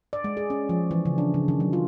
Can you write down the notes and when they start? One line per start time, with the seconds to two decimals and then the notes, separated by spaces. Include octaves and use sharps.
0.13 D5
0.24 G#3
0.37 G#4
0.50 C#4
0.69 F3
0.91 E3
1.05 C#3
1.18 D4
1.34 C#3
1.48 D#3
1.60 F#3
1.73 F4